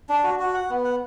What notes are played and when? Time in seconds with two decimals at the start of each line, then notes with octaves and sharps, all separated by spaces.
0.09 D4
0.24 F#4
0.39 F#4
0.54 F#5
0.70 B3
0.84 F#5